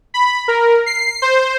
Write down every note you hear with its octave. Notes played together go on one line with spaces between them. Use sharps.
B5
A#4
C7
C5